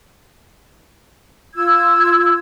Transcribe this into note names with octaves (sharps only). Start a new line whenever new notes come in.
F4 E6 G#6